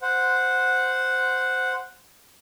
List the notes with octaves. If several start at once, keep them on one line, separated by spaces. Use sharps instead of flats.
C5 F#5